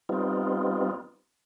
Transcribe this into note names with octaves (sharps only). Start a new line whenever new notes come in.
G3 B3 C4 D#4 F4